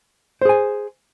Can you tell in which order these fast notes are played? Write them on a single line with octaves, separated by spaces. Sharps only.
C5 G#4 G#5